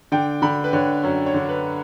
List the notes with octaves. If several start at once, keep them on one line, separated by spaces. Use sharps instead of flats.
D3 G5
D3 B5
B4
D3 C#5
F#2 C#5
C#5
D3
B4